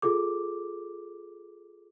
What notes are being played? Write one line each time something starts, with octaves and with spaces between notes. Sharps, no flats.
F4 G#4 A4 D6